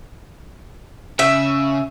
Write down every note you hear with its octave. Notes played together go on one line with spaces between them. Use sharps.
C#3 E5